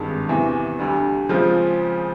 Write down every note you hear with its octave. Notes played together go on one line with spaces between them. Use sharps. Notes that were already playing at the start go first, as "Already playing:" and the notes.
Already playing: G#1 G2 D#3 G#3
E2 C3 E3
D2 D3 G3
C#3 F3 G#3 C4 F4